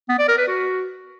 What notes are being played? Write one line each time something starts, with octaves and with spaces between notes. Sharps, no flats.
B3
D5
A#4
B4
F#4